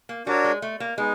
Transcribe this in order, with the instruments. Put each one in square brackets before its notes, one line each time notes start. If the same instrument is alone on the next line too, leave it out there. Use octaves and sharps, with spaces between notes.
[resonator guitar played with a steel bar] A#3
[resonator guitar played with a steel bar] G3 [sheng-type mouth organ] D4 F#4 A#4 C#5
[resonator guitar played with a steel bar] G#3
A3
A#3
[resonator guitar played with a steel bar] G#3 [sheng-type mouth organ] B3 D#4